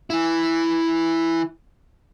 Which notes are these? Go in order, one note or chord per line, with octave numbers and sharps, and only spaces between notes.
E3 E4